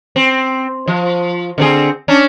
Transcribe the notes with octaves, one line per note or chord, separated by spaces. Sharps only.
C4
F3
D3 C4 G#4
C#4 D4